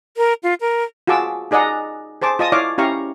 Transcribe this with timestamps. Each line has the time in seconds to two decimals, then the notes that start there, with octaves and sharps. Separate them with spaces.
0.17 A#4
0.43 F4
0.61 A#4
1.07 F4 F#4 G#4 A5 D6 E6
1.51 D#4 G#4 D5 D#5 F#5 A#5
2.22 G#4 C5 A5 D6
2.39 F4 D#5 A5 D#6
2.52 E4 C#5 D5 F5 D6
2.78 C#4 E4 G4 F5 A#5 C#6